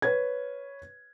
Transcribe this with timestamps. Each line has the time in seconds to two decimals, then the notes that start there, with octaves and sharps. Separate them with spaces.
0.02 B4 C#5 G#6